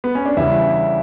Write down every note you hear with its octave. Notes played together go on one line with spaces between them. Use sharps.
B3
C#4
D4
E2 C#3 G3 E4